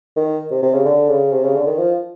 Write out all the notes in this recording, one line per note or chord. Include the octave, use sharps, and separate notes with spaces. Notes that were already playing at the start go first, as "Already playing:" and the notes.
D#3
C3
C3
C#3
D3
C#3
C3
C#3
D3
D#3
F3